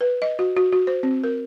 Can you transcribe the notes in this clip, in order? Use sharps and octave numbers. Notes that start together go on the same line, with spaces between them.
B4
D#5
F#4
F#4
F#4
C5
C4
A#4